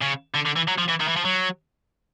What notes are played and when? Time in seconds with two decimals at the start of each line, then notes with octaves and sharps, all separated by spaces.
0.01 C#3
0.34 D3
0.46 D3
0.56 E3
0.68 F#3
0.78 F3
0.89 E3
1.01 D#3
1.08 E3
1.17 F3
1.25 F#3